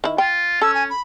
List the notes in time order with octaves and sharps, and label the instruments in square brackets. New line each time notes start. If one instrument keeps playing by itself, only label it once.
[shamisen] D#3 E4
[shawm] F4 [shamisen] G5
[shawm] C#4 [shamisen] A4 [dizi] E6
[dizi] G#5
B5